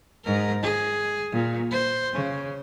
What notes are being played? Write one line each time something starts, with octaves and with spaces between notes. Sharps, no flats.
G#2 A#4
G#4
A#2
C5
C#3